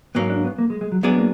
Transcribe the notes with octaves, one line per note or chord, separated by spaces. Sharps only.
G#2 F#3 A#3 B3
D4
B3
A#3
G#3
G#3
F#3
F#3 G#3 B3 D4 G#4 D5
A#3